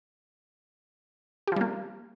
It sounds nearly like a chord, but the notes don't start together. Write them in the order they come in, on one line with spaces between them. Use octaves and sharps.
G4 F3 G3 A#3